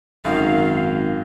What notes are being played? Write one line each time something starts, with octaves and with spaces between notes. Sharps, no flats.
G#1 F#2 D#3 F5